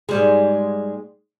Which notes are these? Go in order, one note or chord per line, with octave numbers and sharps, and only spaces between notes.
G#2 G3 G#3